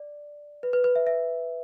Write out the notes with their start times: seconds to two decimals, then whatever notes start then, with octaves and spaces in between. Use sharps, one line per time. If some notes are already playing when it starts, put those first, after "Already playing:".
Already playing: D5
0.63 B4
0.73 B4
0.84 B4
0.96 E5
1.07 E5